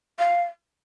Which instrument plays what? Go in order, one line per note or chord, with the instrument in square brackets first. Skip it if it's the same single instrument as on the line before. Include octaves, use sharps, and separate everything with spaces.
[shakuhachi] F5